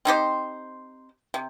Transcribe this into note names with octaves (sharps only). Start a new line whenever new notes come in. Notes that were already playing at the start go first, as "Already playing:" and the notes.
C4 D#4 G4 C5
C3